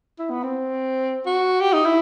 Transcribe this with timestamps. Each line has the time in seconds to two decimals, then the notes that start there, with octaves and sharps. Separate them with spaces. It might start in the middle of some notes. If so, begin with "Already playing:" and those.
0.19 E4
0.30 B3
0.43 C4
1.26 F#4
1.61 G4
1.73 D#4
1.86 E4